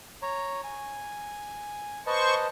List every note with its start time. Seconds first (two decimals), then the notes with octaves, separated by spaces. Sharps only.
0.22 C#5 A#5
0.64 G#5
2.07 B4 C5 D#5 A5 C#6